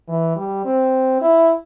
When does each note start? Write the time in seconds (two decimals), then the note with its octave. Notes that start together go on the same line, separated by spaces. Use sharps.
0.09 E3
0.36 G3
0.65 C4
1.22 E4